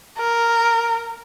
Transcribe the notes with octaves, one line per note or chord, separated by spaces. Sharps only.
A#4